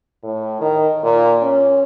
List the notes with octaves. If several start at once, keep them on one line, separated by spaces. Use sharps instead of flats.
A2
D#3
A#2
C#4